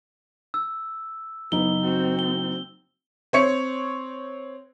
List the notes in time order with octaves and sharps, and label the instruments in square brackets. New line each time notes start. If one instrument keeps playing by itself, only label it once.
[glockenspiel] E6
[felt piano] F#1 D#4 [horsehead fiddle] B3 [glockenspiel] G7
[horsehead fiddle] C4 F#4
[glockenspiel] G7
[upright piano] C4 C#5 C#7